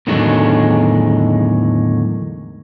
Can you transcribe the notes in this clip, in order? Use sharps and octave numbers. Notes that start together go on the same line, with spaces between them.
E2 A2 D3 D#3 F#3 G#3